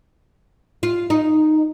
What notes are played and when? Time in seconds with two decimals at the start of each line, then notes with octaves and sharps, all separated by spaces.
0.83 F4
1.10 D#4